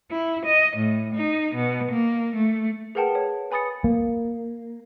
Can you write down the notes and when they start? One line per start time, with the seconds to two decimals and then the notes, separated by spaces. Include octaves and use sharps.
0.11 E4
0.45 D#5
0.76 A2
1.15 D#4
1.55 B2
1.91 A#3
2.35 A3
2.95 G#4 A#4 B4 F#5 G5 A5
3.15 C#5
3.51 B4 G#5 B5 D#6 A6 C#7
3.84 A#3